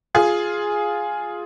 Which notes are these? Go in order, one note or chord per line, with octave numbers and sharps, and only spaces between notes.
F4 G#4